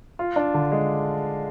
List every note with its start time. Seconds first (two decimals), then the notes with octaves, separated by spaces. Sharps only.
0.19 F4
0.36 D4
0.54 D3
0.72 G#3